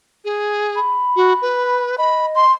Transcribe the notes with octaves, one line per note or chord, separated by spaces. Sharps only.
G#4
B5
F#4
B4
D#5 B5
C6